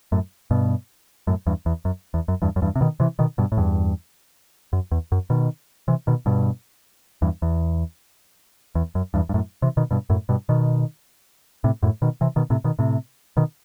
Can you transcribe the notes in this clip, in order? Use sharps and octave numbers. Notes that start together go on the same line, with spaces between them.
F#2 A2
G2 B2
F#2 A2
E2 G2
E2
F#2
E2
F#2
E2 G2
F#2
E2 G2
C3
B2 D#3
C3 E3
B2 D#3
G2 B2
A2
E2 G2
F#2
E2
F#2
B2 D#3
C3 E3
B2 D#3
G2 B2
E2 G2
E2
E2
F#2
E2 G2
G2
F#2 A2
C3 E3
B2 D#3
G2 B2
F#2 A2
G2 B2
B2 D#3
A2 C3
F#2 A2
B2 D#3
C3 E3
B2 D#3
A2 C3
B2 D#3
A2 C3
B2 D#3